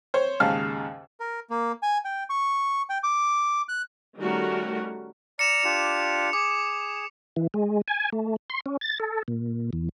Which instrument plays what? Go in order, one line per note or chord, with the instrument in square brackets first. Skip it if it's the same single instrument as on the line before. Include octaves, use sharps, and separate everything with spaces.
[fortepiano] C5 C#5
D#2 G#2 C#3 F5 A5 F6
[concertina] A#4
A#3
G#5
G5
C#6
G5
D6
F#6
[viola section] D#3 G3 A3 C#4 F#4 A#4
[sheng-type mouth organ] D5 A#5 F6 [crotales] C#7 E7 F7
[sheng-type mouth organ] D4 F4 G4
[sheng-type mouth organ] G#4 [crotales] D6
[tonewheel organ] E3
G#3
G#5
A3
C6
C#4
A6
A4
A#2
E2